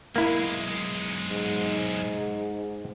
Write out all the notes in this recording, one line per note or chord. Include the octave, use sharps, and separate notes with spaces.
B1 G#3 A#3 E4
G#2